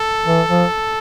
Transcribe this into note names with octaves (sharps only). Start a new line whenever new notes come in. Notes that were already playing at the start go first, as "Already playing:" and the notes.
Already playing: A4
E3
F3